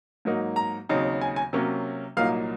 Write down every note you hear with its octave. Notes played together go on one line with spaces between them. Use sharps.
G#2 F#3 A#3 D#4
A#5
D#2 C#3 F#3 C4 D#4
G#5
G#5
C3 F#3 A#3 C#4
C2 A#2 F#3 A#3 D#4 F5